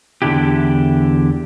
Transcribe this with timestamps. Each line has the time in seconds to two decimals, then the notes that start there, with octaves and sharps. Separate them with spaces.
0.22 E2 G2 D3 D4 E4 G4